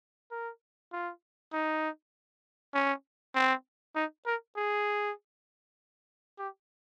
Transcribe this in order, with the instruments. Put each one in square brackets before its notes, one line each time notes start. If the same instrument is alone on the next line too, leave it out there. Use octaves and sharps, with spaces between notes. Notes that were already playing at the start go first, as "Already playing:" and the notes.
[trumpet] A#4
F4
D#4
C#4
C4
D#4
A#4
G#4
G4